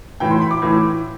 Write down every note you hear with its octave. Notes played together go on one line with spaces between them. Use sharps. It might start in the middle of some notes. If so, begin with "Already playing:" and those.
A2 E3 G5
C6
B5
D6
A2 E3